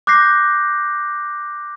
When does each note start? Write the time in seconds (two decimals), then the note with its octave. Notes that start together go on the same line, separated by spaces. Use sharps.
0.07 D6 F#6 G6 A#6 C7